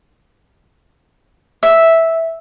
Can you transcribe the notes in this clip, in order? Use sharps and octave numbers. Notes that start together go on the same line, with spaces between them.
E5